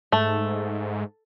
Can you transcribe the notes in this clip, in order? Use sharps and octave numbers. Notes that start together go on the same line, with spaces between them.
G#2 A3